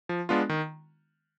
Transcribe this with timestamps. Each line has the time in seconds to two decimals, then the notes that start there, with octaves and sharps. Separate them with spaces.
0.09 F3
0.29 G#3 B3 D4 F4
0.49 D#3